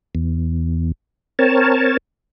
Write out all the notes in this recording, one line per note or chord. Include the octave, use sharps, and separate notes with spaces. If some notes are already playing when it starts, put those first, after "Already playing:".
E2
C4 A#4 C#5 A5